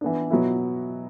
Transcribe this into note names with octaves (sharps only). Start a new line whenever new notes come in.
E3 B3 D4
B2 F#3 B3 E4